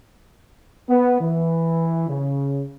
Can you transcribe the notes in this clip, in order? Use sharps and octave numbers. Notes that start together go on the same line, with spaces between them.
B3
E3
C#3